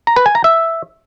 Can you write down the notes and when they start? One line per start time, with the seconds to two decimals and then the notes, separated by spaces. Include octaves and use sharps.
0.07 A#5
0.16 B4
0.26 G#5
0.35 A#5
0.44 E5